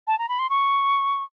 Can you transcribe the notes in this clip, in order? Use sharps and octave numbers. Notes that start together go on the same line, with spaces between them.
A5
A#5
B5
C6
C#6